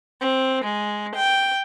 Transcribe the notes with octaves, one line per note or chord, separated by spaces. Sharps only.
C4
G#3
G5